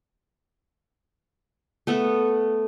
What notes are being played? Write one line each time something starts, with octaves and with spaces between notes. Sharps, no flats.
A3 B3 A4